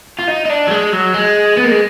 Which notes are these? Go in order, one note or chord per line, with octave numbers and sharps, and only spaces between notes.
F4
D#4
D#4
D4
F#3
G#3
F#3
G#3
B3
A#3
G#3